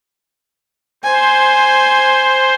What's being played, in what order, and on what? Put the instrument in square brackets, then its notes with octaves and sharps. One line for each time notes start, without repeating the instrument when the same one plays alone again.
[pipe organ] C5 [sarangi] G#5